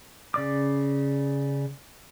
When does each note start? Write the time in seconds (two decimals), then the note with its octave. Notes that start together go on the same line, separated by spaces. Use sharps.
0.34 C#3 D5 D6